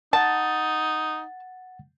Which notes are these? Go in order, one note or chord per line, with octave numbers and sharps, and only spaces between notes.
D#4 F#5 A5 A6